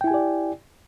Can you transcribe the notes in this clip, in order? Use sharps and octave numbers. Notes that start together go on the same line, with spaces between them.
E4 G4 D5 G5 G#5